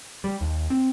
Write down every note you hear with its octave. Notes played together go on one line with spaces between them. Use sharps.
G3
D#2
C4